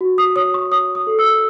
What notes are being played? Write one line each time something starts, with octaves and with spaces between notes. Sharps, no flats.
F#4
D#6
C#5 D#6
C#6
C#5 D#6
D#6
A4
E6